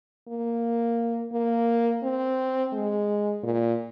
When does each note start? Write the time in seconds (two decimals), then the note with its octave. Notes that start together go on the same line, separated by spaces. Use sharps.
0.28 A#3
1.33 A#3
2.03 C4
2.73 G#3
3.43 A#2